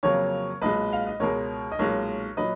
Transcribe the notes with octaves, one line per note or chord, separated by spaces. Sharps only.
F2 C#3 F#3 A#3 A#4 C#5
B1 A#2 G#3 B4 D#5
F5
D#5
C#2 B2 G#3 A#4 C#5
D#5
B1 A#2 G#3 A#4 C#5
A#2 F#3 B4 D#5